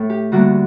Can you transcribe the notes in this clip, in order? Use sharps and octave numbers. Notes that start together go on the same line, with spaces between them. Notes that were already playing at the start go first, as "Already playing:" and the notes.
Already playing: A2 A3 A4
G4
D2 D3 G3 A#3 F#4